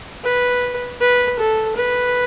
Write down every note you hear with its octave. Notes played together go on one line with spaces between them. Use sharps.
B4
B4
A4
B4